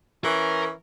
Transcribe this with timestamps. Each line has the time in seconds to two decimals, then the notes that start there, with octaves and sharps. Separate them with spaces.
0.24 E3 C#4 A#4